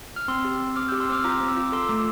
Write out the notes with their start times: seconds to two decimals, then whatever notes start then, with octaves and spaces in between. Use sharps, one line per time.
0.16 F6
0.28 C4 C6 E6
0.45 G4
0.60 C4
0.76 C4 D6 F6
0.88 E6 G6
0.92 G4
1.00 C6 E6
1.09 C4 D6 F6
1.24 F4 A#5 D6
1.40 C4
1.48 E6
1.57 F4 D6
1.72 A4 C6 E6
1.89 A3